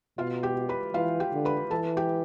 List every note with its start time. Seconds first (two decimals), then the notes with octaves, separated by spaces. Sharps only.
0.18 B2 F4 F5
0.43 G4 G5
0.69 B4 B5
0.94 E3 F4 F5
1.20 G4 G5
1.33 D3
1.45 B4 B5
1.70 E3 A4 A5
1.97 G4 G5